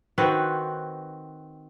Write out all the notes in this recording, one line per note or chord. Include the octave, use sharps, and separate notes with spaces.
D#3 C4 F#4 B4